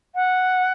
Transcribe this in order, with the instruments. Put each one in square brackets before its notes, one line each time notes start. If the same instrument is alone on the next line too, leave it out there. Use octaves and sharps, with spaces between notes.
[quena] F#5